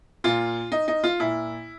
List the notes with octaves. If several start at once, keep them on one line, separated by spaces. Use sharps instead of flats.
A#2 F4
D#4
D#4
F4
A#2 E4